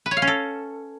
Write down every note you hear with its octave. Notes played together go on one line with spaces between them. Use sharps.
B4
C#5
F5
C#4
A4